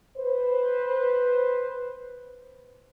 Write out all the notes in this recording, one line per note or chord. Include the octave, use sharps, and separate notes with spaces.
B4 C5